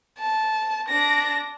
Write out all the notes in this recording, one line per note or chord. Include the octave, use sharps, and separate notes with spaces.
A5
D4 A#6